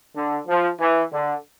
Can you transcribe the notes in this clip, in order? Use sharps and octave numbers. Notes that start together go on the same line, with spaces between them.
D3
F3
E3
D3